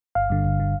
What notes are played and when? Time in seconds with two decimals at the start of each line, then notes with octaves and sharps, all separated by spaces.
0.15 G1 F5
0.30 G2 D3
0.44 G1
0.60 D3